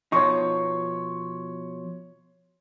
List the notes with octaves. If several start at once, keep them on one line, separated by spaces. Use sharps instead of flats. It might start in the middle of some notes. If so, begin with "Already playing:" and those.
B2 F3 D#4 C#5 C6 C#6